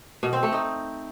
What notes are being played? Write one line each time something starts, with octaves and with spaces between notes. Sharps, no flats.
B2
C4
A3
D#4